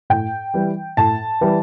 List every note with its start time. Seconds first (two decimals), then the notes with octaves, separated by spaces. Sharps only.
0.10 A2 G5
0.54 E3 G3
0.97 A2 A5
1.41 E3 G3